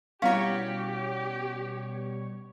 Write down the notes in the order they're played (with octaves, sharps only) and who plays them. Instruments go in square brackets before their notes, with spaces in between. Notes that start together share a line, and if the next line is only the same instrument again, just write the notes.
[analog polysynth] B2 G3 C#5 [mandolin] C#4 F#4 [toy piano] E4 F5 [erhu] G4